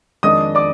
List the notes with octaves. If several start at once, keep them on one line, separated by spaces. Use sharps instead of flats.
F2 D#3 G#3 D4 D#5 D#6
D5 D6